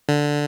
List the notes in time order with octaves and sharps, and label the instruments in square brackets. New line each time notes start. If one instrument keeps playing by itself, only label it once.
[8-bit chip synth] D3